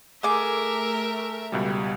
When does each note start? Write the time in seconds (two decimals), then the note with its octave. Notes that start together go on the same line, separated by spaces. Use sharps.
0.23 A3 G#4 A#4 E5 D6
1.52 C#2 B2 G3